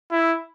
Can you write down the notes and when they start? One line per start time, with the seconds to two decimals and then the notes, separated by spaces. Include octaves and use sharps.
0.11 E4